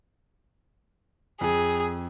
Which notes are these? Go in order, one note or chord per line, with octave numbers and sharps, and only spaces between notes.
F2 G#4